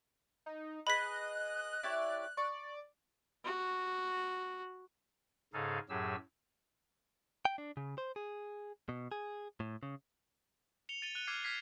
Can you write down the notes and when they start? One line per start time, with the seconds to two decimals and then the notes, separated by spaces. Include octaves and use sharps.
0.46 D#4
0.87 G#4 B4 D#5 B5 F#6 B6
1.83 E4 G4 C#5 D5
2.37 D5 C#6
3.45 F#4
5.53 G#2 C#3 D#4 G#4 A4 F5
5.89 F#2 A2 F#3 G4 G#4 E6
7.45 G5
7.58 D4
7.77 C#3
7.98 C5
8.16 G#4
8.89 B2
9.12 G#4
9.60 A2
9.83 C#3
10.89 C#7 F7 G7
11.02 A6 D#7 G7
11.15 F#6 D#7 G7
11.27 D6 F6 G#6 C7
11.44 F6 G#6 B6 C7